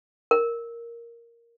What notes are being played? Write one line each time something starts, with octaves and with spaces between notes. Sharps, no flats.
A#4